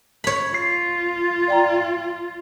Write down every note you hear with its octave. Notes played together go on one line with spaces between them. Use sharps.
C#5 B5
F4 C7
D5 G5 A#5